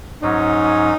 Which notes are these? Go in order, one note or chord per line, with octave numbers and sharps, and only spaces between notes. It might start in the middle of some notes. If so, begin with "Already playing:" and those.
G#2 F#3 C#4 D#4